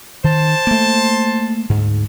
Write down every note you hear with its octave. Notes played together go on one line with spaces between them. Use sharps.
D#3 C5 A5
A3 A#3
D2 G#2